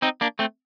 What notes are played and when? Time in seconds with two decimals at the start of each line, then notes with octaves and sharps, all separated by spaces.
0.02 C4 D#4
0.21 A#3 D4
0.39 A3 C4